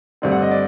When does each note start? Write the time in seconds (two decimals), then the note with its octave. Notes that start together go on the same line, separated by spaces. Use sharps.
0.22 G2 D3 A3 C4
0.32 F#5
0.42 D#5
0.51 D5